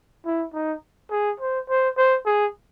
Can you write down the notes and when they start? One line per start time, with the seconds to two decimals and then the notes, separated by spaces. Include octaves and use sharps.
0.26 E4
0.54 D#4
1.11 G#4
1.40 C5
1.69 C5
1.97 C5
2.26 G#4